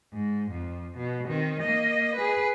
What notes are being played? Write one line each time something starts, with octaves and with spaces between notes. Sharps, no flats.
G#2
F2
B2
D#3 C4
A#3 D#5
G#4 B4